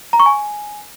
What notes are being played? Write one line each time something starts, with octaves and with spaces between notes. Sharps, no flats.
A#5
C#6
G#5